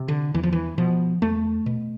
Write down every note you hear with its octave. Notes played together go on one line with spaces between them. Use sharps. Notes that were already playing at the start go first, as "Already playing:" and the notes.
Already playing: C3
D3
E2 E3
F3
E3
B2 F3
E2 A3
B2